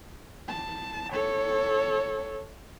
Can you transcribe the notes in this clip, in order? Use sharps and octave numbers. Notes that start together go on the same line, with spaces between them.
A5
A4 C#5